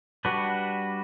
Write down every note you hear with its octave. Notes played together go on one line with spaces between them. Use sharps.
G3 D4 F#4 B4